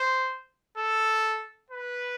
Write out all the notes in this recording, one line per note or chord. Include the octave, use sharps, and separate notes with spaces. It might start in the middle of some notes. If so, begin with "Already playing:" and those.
Already playing: C5
A4
B4